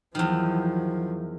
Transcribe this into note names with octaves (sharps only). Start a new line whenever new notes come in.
E2 D#3 F3 F#3